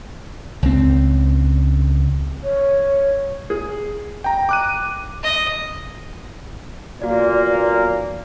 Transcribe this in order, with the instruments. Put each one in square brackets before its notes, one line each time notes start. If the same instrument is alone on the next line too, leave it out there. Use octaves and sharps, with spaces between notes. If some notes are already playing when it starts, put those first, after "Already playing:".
[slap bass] C#2 C4
[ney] C#5
[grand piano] G#4
[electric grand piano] G5 A#5
D6 F#6 D#7
[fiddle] D#5
[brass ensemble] B1 A#2 A#3 [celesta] F#4 D5